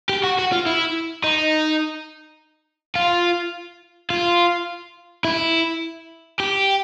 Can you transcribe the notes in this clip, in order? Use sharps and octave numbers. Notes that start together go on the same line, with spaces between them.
G4
F#4
F#4
F4
E4
D#4
F4
F4
E4
G4